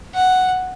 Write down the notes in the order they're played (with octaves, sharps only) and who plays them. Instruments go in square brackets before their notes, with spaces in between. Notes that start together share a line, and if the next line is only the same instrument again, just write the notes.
[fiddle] F#5